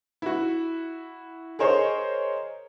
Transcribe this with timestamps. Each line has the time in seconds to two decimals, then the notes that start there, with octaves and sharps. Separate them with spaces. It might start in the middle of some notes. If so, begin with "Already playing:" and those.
0.22 E4 F#4
1.59 G#4 A#4 C5 C#5 D#5